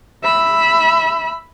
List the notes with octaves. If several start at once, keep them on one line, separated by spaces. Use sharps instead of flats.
E5 B5